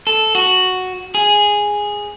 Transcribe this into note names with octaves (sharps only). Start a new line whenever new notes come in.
A4
F#4
G#4